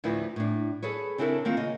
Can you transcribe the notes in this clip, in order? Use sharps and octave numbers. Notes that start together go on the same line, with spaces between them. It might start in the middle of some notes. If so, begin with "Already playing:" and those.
D2 A2 F3 E4 B4
A2 D4
G#4 A4 B4 C#5
C#3 C4 D4 E4 A4 A#4
D#3 A#3 C4 F4
C#3 D#5